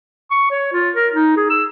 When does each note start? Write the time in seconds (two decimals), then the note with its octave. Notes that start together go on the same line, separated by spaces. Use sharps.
0.31 C#6
0.51 C#5
0.73 F4
0.96 A#4
1.13 D#4
1.37 G#4
1.50 E6